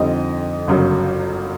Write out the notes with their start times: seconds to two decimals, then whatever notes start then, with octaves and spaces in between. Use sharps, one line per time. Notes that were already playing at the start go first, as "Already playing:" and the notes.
Already playing: F2 D3 G3 C4 D#4 D#5
0.68 G1 F#2 C#3 F#3